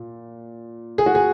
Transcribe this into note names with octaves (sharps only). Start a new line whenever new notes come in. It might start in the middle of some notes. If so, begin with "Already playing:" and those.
Already playing: A#2
G#4
F#4
G#4